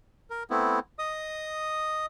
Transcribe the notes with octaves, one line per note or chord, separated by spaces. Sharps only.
A#4
A3 B3 C4 E4
D#5 D#6